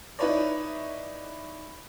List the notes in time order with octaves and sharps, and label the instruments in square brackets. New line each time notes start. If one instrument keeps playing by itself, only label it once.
[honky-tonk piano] D#4 E4 B4 C#5 D5